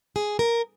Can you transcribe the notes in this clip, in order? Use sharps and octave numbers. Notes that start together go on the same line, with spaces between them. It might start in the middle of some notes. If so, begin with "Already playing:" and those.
G#4
A#4